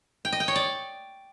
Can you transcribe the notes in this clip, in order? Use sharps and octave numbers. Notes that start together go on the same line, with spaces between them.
G5
D#5
G5
C#5
D5